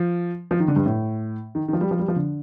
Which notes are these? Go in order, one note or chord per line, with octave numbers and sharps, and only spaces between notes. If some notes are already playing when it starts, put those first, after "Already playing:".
Already playing: F3
F3
D#3
D3
G2
A2
D#3
D#3
F3
G3
F3
G3
F3
D3